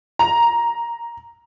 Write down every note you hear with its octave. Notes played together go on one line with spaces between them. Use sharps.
A#5